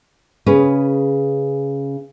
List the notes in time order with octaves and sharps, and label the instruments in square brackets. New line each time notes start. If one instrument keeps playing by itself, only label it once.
[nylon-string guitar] C#3 C#4 G#4 B4